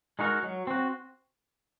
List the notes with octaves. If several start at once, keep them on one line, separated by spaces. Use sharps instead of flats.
G#3 D#4 F#4 A#4
F#3
C4 F#4